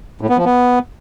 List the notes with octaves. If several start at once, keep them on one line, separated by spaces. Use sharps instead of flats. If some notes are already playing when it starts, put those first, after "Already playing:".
A2
B3
F3
B3